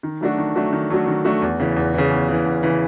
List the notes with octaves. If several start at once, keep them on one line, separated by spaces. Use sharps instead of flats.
D#3
F#3 A3 D4 F#4
D#3
F#3 A3 D4 F#4
D#3
F#3 A3 D4 F#4
D#3
F#3 A3 D4 F#4
E2
C#3 E3
E2
C#3 E3
E2
C#3 E3
E2
C#3 E3